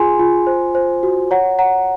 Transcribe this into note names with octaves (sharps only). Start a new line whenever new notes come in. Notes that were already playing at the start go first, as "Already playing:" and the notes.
Already playing: F4 G#4 G#5 C6
F4
C5
C5
F#4
C#5 F#5 A#5
C#5 F#5 A#5